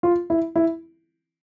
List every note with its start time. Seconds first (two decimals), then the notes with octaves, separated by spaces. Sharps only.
0.03 F4
0.30 E4
0.56 E4